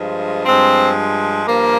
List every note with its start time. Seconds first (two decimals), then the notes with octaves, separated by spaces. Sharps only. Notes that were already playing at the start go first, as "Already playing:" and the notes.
Already playing: G2 F3 G#3
0.45 G2 F3 G#3 C4
1.45 G2 F3 A#3